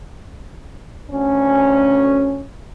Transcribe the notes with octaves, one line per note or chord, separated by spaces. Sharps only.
D2 C#4